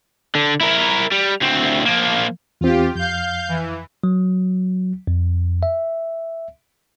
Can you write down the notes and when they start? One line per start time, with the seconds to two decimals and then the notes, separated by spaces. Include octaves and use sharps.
0.35 D3
0.61 E4 A#4
1.12 G3
1.41 D2 C4
1.86 F3 A#3
2.61 E2 C4 F4 G4
2.95 F2 F5 G6
3.48 E3
4.04 F#3
5.07 F2
5.63 E5